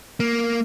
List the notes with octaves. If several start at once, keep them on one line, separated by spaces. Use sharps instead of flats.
A#3